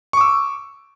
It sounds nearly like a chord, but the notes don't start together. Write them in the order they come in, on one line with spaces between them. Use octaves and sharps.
C#6 D6 E6